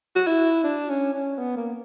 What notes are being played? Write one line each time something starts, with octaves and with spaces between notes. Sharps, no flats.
F#4
E4
D4
C#4
C#4
B3
A#3